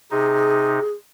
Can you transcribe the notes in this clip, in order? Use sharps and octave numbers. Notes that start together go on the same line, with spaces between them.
C3 D#4 G#4